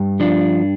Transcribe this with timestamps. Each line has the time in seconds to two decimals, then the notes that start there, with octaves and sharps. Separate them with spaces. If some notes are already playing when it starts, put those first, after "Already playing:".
Already playing: G2
0.20 F3 D4